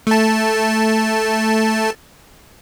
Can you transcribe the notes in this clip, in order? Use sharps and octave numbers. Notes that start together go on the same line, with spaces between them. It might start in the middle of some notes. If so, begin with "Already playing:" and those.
A3 A5